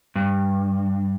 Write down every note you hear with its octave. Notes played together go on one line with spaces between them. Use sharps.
G2